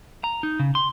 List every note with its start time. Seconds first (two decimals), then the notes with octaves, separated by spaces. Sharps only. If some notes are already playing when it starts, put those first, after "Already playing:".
0.24 A#5
0.43 D#4
0.59 C#3
0.75 C6